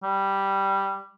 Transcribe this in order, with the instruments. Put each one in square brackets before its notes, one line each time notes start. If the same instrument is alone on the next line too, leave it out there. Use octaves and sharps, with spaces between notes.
[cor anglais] G3